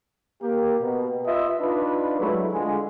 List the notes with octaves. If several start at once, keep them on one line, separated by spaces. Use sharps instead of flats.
A#3 G4 A#4
B2
F4 B4 D#5 E5
D4 D#4 F4 B4
F#3 G#3 A3 E4
D3 G#3 F4